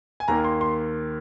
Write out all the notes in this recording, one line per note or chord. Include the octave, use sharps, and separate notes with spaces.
G#5
D#2 D#3 A#3 A#5
C6
C6